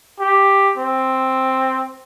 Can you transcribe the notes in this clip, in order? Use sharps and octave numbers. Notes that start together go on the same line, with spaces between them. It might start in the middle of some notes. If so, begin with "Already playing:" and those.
G4
C4